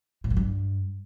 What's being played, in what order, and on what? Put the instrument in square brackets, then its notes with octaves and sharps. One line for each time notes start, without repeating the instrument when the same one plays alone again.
[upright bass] A2
F#2
G2